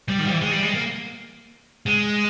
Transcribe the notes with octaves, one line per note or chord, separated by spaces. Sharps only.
G3
D#3
G3
E3
G#3
G3
G#3
A#3
G#3